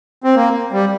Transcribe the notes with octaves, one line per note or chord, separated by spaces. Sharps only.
C4
A#3
G3